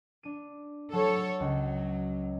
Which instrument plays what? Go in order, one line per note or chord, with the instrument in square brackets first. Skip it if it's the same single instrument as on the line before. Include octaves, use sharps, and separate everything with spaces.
[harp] D4 D#7
[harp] F#3 [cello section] A4 C#5
[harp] C#2 [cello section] F#3